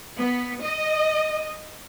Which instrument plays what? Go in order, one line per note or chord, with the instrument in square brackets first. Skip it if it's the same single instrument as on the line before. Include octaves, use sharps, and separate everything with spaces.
[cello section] B3
D#5